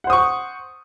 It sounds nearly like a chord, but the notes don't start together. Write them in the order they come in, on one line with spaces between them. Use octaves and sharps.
F#5 C5 D#6 C#6